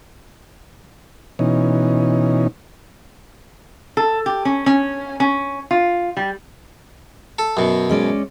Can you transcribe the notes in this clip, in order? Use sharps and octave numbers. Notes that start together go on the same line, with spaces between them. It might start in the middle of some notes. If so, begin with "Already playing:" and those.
B2 E3 C#4 D#4
A4
G4
C#4
C#4
C#4
F4
G3
A4
F#2 B2
G#3 C#4 D5